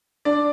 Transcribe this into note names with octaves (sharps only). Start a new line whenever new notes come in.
D4 D5